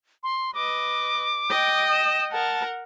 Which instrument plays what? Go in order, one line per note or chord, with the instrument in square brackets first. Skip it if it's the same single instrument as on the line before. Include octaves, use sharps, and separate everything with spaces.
[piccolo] C6
[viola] B4 D#5 [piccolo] D6
[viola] D#5 G5
[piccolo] E7
[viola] A#4 F#5 [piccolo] A5